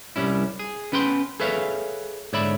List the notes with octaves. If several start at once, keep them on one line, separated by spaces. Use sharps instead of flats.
C2 F#2 G3 C#4 E4
G#4
B3 C#4 B4 G5 C6
G#4 A4 B4 C#5 E5 F5
G#2 D3 C#5 D5 E5 B5